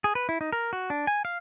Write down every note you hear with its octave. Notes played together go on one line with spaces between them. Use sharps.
G#4
B4
E4
D#4
A#4
F#4
D4
G#5
F5